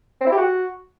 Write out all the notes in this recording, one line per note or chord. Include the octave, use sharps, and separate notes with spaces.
C4
E4
G4
F#4